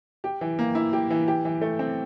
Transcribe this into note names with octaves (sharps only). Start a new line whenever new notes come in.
G4
E3
A#3
E4
G4
E3
G4
E3
A3
C4